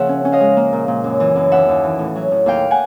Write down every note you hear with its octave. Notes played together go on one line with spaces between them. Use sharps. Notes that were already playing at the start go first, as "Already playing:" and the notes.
Already playing: C#3 F3 A#3 E5 F#5
C#4
C#4
D#5 F5
G#3
A#3
A#2
A#2
F#2
E3
F#2
D#2 E5 F#5
D#2
E3
A2
F#3
A2
D#2 F5 G5
F#5 G#5